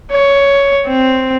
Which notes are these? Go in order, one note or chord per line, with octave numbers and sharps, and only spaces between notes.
C#5
C4